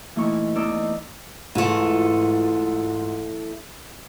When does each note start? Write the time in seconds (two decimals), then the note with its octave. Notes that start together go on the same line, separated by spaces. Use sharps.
0.15 A#2 E3 A3 D#4 E4 C#6
0.55 E2 D#4 D5 D#6 E6
1.55 G#2 E3 A3 F4